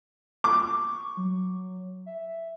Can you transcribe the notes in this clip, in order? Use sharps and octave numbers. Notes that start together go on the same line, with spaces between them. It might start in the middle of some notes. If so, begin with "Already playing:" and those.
C#6 D6
F#3
E5